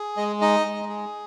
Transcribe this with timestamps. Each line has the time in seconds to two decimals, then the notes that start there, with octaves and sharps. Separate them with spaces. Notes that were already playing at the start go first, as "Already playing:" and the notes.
Already playing: G#4
0.17 G#3 D#5
0.41 D#4 D#5
0.66 G#3
0.89 G#4